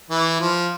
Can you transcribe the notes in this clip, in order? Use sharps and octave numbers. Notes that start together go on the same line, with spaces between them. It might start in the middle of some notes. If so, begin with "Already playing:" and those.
E3
F3